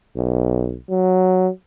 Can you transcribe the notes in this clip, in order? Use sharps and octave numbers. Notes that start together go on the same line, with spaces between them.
B1
F#3